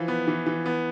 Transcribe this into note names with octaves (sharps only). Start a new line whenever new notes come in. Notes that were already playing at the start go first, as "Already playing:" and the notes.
Already playing: E3 F3
B3
E3
E3
B3